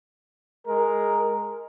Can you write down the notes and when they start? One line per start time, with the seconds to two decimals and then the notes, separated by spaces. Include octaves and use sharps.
0.67 G#3 A#4